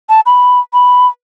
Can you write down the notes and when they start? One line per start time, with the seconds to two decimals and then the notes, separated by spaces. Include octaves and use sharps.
0.09 A5
0.26 B5
0.73 B5